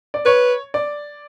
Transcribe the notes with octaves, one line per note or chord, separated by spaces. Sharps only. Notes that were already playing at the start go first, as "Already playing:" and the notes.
D5
B4 C#5
D5